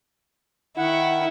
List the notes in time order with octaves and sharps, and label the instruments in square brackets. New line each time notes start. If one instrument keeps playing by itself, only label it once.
[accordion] D#3 F#5 [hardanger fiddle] E4